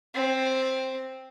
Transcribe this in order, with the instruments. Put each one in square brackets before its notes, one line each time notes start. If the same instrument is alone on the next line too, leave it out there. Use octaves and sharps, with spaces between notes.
[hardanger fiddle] C4